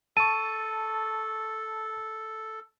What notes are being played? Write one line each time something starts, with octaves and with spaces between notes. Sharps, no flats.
A4 A5 C#6 D#7